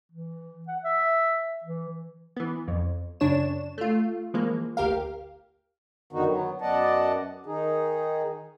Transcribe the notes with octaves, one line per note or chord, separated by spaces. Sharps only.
E3
F#5
E5
E3
E3 B3
F2
F#2 C#3 D4 C#5 E7
A3 F4
E3 F3 G#3 A#3
G1 D2 G4 A#4 F5
F#2 D3 D#3 B3 D#4 F#4
F#3 B3
F#2 B3 D5 D#5 F#5 A5
D#3 D#4 G#4